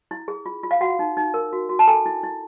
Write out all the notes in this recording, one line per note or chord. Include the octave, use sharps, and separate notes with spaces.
E4
G#4
F4
F4
F5
F#4 F#5
D#4
D#4
A#4
F#4
F#4
A5
A4 G#5
E4
E4